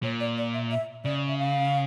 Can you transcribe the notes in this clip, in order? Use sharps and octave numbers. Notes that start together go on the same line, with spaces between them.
A#2 C#5
D5
D5
E5
E5
C#3 D5
E5
F5